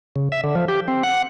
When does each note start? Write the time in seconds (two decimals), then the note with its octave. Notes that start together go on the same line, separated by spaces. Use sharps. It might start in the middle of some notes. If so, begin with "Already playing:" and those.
0.16 C#3
0.32 E5
0.44 D3
0.55 F3
0.68 G4
0.88 C4
1.03 F#5